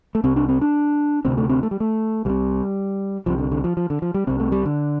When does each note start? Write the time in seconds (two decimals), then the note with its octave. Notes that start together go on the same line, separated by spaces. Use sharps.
0.15 A3
0.24 C2 C3 C4
0.36 D4
0.49 C4
0.61 D4
1.25 D2 C3 C4
1.38 A3
1.50 C4
1.63 A3
1.71 G3
1.80 A3
2.25 C2 C3 G3
3.26 C2 C3 F3
3.38 D3
3.51 D3
3.64 F3
3.77 F3
3.90 D3
4.02 F3
4.14 G3
4.27 C2 C3 C4
4.40 A3
4.52 G3
4.65 D3